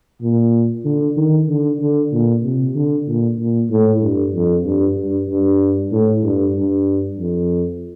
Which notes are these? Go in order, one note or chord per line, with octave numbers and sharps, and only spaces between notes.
A#2
D3
D#3
D3
D3
A#2
C3
D3
A#2
A#2
A2
G2
F2
G2
G2
G2
A2
G2
G2
F2